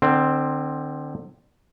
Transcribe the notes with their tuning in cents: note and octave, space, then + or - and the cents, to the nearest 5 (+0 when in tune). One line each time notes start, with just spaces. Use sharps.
D3 +35 C4 +0